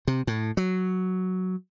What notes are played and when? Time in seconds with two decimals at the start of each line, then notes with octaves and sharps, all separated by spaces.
0.07 C3
0.27 A2
0.57 F#3